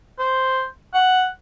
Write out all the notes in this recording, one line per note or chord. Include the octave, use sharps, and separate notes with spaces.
C5
F#5